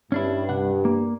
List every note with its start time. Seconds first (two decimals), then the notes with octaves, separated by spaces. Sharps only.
0.12 G2 C#4 D4 E4
0.49 C2 D4 F#5
0.85 A#3